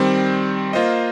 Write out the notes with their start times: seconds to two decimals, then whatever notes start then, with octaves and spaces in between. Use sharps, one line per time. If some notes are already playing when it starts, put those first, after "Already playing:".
Already playing: D#3 G3 C4
0.73 A#3 F4 C5 D#5